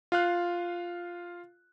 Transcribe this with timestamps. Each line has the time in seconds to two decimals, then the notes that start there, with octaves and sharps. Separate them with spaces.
0.12 F4 F5 F#6